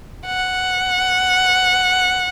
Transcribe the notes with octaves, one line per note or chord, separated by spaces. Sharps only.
F#5